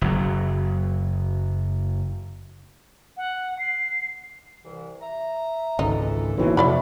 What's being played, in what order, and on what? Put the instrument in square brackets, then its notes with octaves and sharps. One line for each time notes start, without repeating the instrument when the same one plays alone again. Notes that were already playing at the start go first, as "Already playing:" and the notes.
[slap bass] F#1 F#3
[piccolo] F#5
C7
[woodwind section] C2 E3
E5 A#5
[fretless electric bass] G#1 C#2 [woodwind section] A#2 E3 A4 [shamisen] D#4
[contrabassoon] B1 [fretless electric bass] A#2 E3 F#3 [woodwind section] C4 E4 A4
[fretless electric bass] F2 C3 [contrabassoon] A2 [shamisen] E4 D5 B5 [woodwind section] F#4